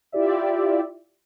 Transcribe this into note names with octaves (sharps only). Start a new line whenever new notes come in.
E4 F4 G4 D5 E5